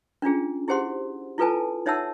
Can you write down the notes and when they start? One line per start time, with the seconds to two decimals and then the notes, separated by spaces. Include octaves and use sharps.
0.22 C#4 D4 F4 G#4
0.68 E4 G4 G#4 C5 F#5 C6
1.38 E4 F4 A4 B4 G#5 A5
1.86 D#4 C#5 E5 F#5 A5 E6